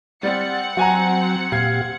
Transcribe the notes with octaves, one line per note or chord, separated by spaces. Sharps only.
G3 C4 F#5 A6 C#7
F#3 F#4 G#5 A#5
A#2 G4 F5 G#6 C7